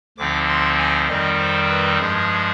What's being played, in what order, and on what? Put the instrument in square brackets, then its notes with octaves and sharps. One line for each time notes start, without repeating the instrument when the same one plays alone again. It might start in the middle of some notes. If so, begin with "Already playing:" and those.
[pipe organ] D2 D3 F3 C4 D#4 D6
C6
G#5
F2 D#3 G3 C4 D#4 D#5
C5
B4
G2 F3 G#3 G#4